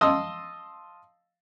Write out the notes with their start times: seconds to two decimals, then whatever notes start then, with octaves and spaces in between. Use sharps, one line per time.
0.01 D#5 F5 A5 C6 D#6 E6